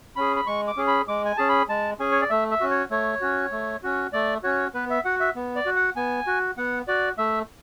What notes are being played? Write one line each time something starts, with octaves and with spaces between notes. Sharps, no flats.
C#4 G#4 B5
B5
G#3 C#6
D6
C#4 G#4
B5
G#3 D6
G#5
C#4 G#4 A5
B5
G#3 A5
C#4 G#4 G#5
C#5
D5
A3 E5
E5
C#4 F#4
C#5
A3 C#5
C#4 F#4
A3
C#4 F#4
A3 D5
C#4 F#4 C#5
B3 B4
E5
F#4 F#5
E5
B3
D5
F#4
F#5
B3 G#5
F#4
B3 F#5
F#4 D5
A3 E5